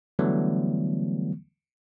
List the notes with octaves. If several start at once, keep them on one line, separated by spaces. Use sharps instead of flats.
D3 E3 F#3 G3 A3 B3